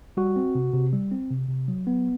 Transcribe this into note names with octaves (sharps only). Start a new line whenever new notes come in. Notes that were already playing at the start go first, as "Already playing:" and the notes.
G3 F#4
C4
C3
C3
G3
C4
C3
C3
F#3
B3